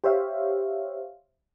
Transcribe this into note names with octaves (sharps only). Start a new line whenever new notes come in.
G4 C5 C#5 E5 F5